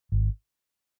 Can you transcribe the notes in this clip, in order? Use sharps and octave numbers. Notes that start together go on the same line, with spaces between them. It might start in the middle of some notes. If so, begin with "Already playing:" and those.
G#1